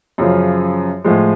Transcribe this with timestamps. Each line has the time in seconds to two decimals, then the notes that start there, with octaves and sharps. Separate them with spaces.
0.18 F#2 C#3 F3
1.04 A2 F3 G#3